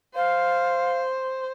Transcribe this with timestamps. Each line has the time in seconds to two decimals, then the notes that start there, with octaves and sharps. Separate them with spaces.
0.16 C5 F5